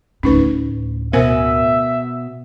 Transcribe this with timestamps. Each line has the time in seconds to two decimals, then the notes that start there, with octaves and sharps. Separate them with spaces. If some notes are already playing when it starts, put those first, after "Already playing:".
0.23 D2 A2 C#4 D#4 B4
1.13 B2 B3 A#4 C5 E5 G#5